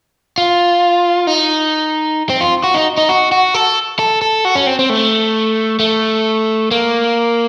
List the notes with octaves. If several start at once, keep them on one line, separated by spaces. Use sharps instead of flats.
F4
D#4
C4
F4
F#4
D#4
D#4
F#4
F#4
A4
A4
A4
F#4
C#4
C4
C4
A3
A3
A#3